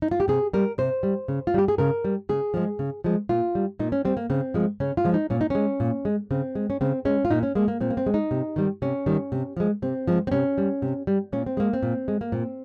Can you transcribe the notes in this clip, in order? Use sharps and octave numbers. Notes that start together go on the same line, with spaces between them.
D#4
F4
G4
C3 G#4
G3 A#4
C3 C5
G3
C#3
F4
G3 G4
G#4
C#3 A#4
G3
C#3 G#4
F3 G#3
C#3
F3 G#3
A#2 F4
G3
A#2 D#4
C#4
G3 C4
A#3
C#3 C4
F3 G#3
C#3 C#4
F4
F3 G#3
D#4
A#2 C#4
D#4
G#3 C#4
A#2
G#3
C#3 C4
G#3
C#4
C#3 C4
G#3 C#4
F4
A#2 D#4
C#4
G#3 A#3
A#3
A#2 C4
A#3
C4
G#3
D#4
C3
D#3 G3
C3 C#4
D#3 G3
C3
F3 G#3
C3 C4
F3 G#3
C4
C3 C#4
G3
C3
G3
A#2 C#4
C4
G#3 A#3
C4
A#2
G#3
A#3
A#2 C4